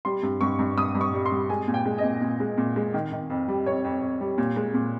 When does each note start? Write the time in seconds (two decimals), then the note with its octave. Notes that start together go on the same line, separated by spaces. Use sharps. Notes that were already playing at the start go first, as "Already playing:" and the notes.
0.05 G3 C6
0.23 G2
0.41 G2 C#6
0.59 G2
0.77 G2 D#6
0.95 G2
1.01 C#6
1.14 G3
1.26 C6
1.32 G3
1.50 G#3 G#5
1.68 A#2
1.74 G5
1.86 G#3
1.98 D#5
2.03 A#2
2.21 A#2
2.40 G#3
2.58 A#2
2.76 G#3
2.94 D#3
3.12 D#3
3.30 F2
3.48 G3
3.66 F2 C#5
3.85 F2
4.02 F2
4.21 G3
4.38 A#2
4.56 G#3
4.74 A#2